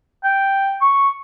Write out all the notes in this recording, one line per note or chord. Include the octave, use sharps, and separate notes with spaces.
G5
C#6